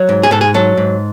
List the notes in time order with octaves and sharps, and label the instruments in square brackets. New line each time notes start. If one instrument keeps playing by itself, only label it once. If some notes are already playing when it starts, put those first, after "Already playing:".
Already playing: [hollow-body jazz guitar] F#3
G#2
G#4
G#2 A4
G#4
F#3 A4
G#2